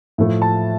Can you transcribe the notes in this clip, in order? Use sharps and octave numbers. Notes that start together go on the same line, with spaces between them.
A2 F3 A3
A5